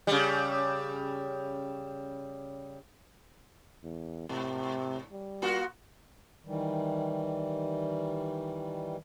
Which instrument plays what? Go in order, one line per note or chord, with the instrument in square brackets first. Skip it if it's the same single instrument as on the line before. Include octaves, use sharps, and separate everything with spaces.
[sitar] C#3 G3
[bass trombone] E2
[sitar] G#2 [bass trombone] C3
[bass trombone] G3
[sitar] A#3 F4 F#4
[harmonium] D#3 E3 G3